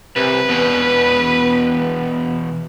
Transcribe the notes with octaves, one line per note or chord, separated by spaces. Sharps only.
C2 C3 B4
E2 B2 B3